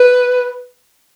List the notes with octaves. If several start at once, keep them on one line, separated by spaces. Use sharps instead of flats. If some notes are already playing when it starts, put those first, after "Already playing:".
Already playing: B4